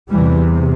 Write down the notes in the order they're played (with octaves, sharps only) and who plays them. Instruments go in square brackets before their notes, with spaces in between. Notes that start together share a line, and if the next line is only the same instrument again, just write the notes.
[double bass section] E2 C3 E3 G3